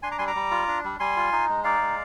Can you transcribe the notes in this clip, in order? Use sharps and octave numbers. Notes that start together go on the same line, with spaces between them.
D4 G#5 C6
A#5 D6
G3 G#5 C6
A#5 D6
G3
F4
D4
G3
G3 G#5 C6
F4
D#4
G#3
D#4 D5 F5
G#3